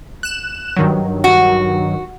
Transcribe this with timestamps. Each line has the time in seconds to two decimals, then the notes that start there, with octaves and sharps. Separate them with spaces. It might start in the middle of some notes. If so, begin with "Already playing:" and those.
0.23 F#6 E7
0.77 G2 D#3 F#3
1.24 F#4